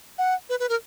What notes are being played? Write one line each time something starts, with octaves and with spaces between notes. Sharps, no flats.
F#5
B4
B4
A#4